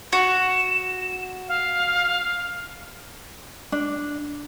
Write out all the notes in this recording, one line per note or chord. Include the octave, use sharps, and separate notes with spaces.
F#4 E7
F5
D4